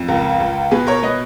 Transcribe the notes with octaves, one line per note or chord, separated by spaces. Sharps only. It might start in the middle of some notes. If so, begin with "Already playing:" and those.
Already playing: F2
C#2 A#4
C#2
B2 G#4 B4
A#4 C#5
B2 B4 D#5